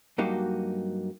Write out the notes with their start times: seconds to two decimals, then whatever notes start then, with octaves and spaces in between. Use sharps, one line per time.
0.18 G2 F#3 A#3 D#4 F#4 G4